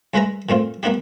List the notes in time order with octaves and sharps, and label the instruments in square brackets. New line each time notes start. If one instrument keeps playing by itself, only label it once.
[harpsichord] C2 G#3 E4 B4 E5 A#5
A#2 A3 C4 F4
G3 A#3 B3 D4 E4 G4